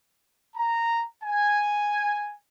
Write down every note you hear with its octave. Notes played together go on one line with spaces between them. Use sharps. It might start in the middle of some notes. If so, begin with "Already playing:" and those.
A#5
G#5